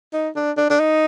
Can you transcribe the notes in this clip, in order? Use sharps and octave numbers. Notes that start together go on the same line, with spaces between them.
D#4
D4
D4
D4
D#4